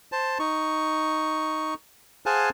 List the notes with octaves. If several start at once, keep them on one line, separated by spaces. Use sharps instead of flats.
C5 A5
D#4 C#6
G#4 C5 F5 F#5 G#5 A5